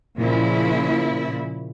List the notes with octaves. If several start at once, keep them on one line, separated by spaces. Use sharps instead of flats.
A#2 C#3 F3 E4